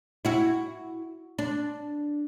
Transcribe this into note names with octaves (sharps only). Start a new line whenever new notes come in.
E4 F#4
D4